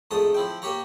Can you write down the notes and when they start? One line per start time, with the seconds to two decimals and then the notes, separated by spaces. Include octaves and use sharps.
0.11 F2 G#2 A3 A5 D#6
0.34 F3 E4 G5
0.62 A#3 G4 C#5 A#5